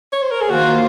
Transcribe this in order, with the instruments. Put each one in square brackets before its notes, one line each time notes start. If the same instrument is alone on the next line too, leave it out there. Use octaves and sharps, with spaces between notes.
[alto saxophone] C#5
C5
A#4
G#4
[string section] D#3 A#3 F4 C5 [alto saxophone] F#4